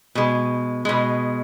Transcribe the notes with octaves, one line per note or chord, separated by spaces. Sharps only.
B2 G#3
B2 G#3